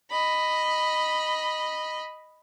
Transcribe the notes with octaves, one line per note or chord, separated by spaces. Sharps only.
D#5 B5